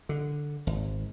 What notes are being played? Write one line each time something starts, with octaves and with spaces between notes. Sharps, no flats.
D3
G#1